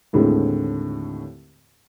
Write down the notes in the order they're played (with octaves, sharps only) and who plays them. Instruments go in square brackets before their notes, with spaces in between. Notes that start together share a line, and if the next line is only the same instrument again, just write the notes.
[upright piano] D#2 A2 D3 G#3 C4